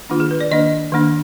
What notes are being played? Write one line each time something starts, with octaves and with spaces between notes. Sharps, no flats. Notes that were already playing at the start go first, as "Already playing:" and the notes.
D#3 A#3 D4 F4
G#4
B4
D5
D#3 A#3 D4 D#5
D#3 A#3 D4